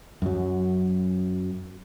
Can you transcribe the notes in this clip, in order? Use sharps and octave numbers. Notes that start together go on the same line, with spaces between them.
F#2 F#3